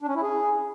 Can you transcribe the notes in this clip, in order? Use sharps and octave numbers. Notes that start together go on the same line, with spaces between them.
D4
C#4
E4
G#4